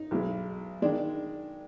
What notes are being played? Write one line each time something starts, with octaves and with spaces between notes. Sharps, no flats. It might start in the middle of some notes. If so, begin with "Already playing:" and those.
Already playing: D#4
B1 B2 G#3
D#3 G#3 D4